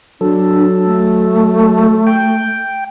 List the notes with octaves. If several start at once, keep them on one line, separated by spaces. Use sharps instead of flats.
F#3 D4 A4
A3
G5